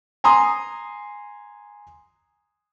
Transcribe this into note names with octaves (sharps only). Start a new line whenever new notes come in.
G#5 A#5 C6 D#6